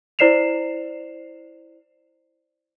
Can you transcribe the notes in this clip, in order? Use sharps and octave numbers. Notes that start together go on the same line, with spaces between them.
E4 C5 D5 C7 E7 F7